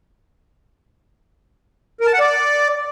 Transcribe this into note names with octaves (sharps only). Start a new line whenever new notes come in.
A#4
A5
F#5
D5